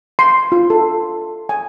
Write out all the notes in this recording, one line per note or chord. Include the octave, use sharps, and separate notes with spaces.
C6
F4
A4
G#5